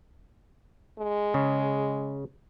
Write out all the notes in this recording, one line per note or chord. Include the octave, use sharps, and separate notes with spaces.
G#3
C#3